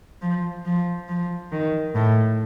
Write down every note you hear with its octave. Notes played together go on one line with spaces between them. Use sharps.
F3
F3
F3
D#3
A2